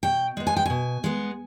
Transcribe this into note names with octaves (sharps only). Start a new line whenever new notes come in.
B2 G5
G#3 B3
G#5
G5
B2 G#5
G#3 B3